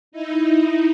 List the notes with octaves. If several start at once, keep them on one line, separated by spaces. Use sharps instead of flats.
D#4 E4